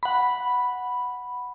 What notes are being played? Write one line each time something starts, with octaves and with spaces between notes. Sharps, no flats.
F#5 B5